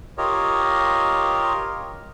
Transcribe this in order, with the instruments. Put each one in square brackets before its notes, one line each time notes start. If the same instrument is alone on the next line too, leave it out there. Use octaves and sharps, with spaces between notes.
[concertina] F4 G4 A#4 C#5 D#5